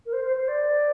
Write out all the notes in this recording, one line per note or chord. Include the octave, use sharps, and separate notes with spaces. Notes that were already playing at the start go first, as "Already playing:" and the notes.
A#4
C5
C5
C5
D5